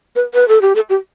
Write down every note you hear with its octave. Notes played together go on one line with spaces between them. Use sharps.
B4
B4
A4
G4
A4
G4